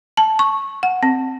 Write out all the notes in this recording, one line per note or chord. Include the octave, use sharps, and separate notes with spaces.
A5
C#6
F#5
C4